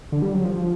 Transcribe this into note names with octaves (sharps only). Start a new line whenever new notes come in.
D3
G3
F#3
F3
F3